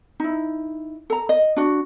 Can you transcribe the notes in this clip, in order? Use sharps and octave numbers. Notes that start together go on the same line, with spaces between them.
D#4 E4
A4 A#5
D#5
D4 F#4